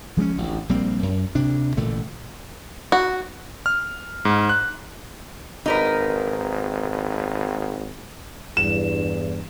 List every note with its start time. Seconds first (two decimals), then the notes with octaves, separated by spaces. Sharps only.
0.17 F3 G#3 B3 C#4
0.37 A1 D2
0.69 A#1 G3 A#3 C4
1.03 F#2
1.35 D2 C3 D4
1.77 A1 A#2 D3 A3
2.92 F#4
3.66 F6
4.25 G#2
4.49 F#6
5.66 G#1 D#4 A#4 B4
8.57 E2 G2 E7